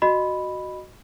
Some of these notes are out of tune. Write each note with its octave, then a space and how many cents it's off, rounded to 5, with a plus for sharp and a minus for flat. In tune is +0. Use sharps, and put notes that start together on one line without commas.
F#4 +0 D#5 -15 B5 +0